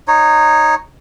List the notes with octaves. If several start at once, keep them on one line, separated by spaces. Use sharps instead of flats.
D#4 C#5